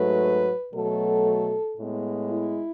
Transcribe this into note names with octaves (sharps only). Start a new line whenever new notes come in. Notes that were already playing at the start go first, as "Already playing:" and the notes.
Already playing: G#2 F#3 A3 B4
B2 F#3 A3 A4
A2 G#3 B3
E4